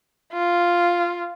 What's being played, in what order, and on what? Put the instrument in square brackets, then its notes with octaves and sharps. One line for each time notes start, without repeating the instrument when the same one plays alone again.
[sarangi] F4